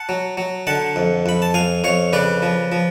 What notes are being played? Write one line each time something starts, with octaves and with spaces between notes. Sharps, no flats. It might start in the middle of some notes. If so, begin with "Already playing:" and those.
Already playing: F#5 A5
F#3
F#3
D3 F#5 A5
F2
F2 B5
A5
F2 F5 G#5
F2 C#5 F5
C#3 B4 D5
F3
F3